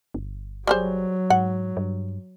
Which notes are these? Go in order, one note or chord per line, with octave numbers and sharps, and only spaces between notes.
G1
F#3 G3 G#4 C5
G#2 F#5
G2